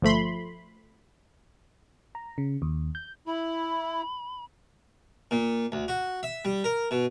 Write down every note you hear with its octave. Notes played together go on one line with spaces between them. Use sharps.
G1 F3 A3 B5 C6
A#5
C#3
D#2
G6
E4 B5
A#2
D2
F#4
E5
G3
A#4
B2